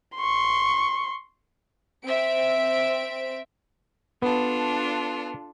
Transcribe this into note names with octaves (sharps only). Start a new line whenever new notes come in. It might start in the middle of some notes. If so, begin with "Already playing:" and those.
C6 C#6
C4 E5 D7
B3 D4 F4 A4